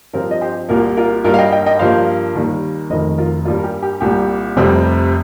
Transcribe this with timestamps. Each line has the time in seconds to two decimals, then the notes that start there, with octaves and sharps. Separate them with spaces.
0.13 G2 F3 C4 F4 A#4
0.31 D#5
0.41 G4 C5
0.69 C2 A#2 A#3 F4 A#4
0.96 F4 A#4
1.24 G2 G3 A#3 F4 A#4
1.34 F5
1.38 D#5 G5
1.52 D#5 G5
1.66 D#5 G5
1.79 G2 F3 A#3 C5 F5
2.35 D#2 D#3 G3 A#3
2.90 F1 F2 D#3 A#4 D#5
3.18 F4 A#4
3.45 G2 G3 A#3 F4
3.58 A#4
3.64 G4
3.82 G4
4.00 C2 A#2 G3 G4
4.56 F1 F2 C3 G3 C4